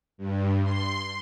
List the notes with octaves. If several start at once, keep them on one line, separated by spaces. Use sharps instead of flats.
G2
C6